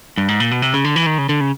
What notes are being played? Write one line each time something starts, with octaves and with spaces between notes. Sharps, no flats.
G2
G#2
A#2
B2
C3
C#3
D3
E3
D#3
C#3
D3
C#3